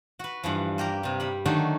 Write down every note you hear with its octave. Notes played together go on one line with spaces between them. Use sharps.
F#4 B4
G2 E3 F3
A#3 G4 A#4 A#5
G2 C3
G3 B5
D3 D#3 F#3 A3 D4 D#4